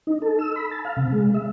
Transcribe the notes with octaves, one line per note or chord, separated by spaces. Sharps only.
D#4
A4
E6
B5
A5
F5
C3
G#3
E5